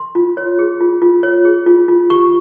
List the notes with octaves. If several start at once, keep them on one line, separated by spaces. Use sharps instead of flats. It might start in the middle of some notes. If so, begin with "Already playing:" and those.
Already playing: C6
F4
C#5
G#4
F4
F4
C#5
G#4
F4
F4
G4 C#6